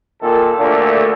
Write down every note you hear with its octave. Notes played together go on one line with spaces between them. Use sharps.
A#2 D#3 A4
D2 A#2 A3 D4